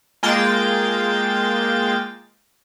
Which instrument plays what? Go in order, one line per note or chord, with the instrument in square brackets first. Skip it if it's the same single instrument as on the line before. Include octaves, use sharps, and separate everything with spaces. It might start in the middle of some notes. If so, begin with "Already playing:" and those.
[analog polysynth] G#3 A#3 F4 G5 A6